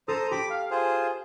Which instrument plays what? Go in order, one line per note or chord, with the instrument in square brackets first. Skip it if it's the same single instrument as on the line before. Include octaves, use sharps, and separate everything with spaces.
[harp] A4 [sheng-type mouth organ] C5 A#5 D#6
[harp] G4 [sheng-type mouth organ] B5 D6
[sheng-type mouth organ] F5
F4 G#4 C5